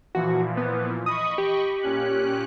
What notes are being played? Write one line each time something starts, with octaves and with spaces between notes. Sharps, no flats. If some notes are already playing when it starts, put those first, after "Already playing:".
A#2 E3 F3 F#4
B3
D#5 B5 C#6 D#6
G4
A#2 C#4 F#6